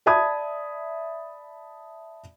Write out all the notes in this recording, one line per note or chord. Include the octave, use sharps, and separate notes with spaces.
D5 E5 A5 B5 D#6 G#6